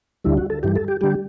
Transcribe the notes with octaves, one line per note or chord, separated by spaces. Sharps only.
D2 D3 G3 E4
F#4
A4
G2 E3 G3 G4
A4
G4
D3 G3 G4